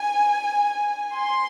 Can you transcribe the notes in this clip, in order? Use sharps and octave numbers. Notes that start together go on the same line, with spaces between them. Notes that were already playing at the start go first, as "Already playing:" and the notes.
Already playing: G#5
C6